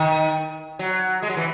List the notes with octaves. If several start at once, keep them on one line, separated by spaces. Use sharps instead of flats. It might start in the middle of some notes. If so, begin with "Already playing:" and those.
Already playing: D#3
F#3
G#3
F#3
E3